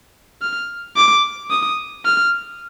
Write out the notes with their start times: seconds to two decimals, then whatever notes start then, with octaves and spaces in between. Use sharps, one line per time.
0.42 F6
0.96 D6
1.51 D#6
2.05 F6